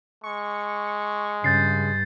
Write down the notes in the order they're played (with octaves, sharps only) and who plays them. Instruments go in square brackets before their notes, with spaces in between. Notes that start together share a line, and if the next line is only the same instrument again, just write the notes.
[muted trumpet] G#3 [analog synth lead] C#6
[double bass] G2 [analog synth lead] C#3 [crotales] G6 A6 C7